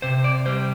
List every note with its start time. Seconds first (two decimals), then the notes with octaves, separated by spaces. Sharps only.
0.02 C3 C5
0.24 D5
0.46 G3 C5